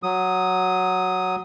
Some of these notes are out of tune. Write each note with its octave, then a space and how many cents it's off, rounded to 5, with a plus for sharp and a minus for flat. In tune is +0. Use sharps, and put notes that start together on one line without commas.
F#3 +0 D#6 +0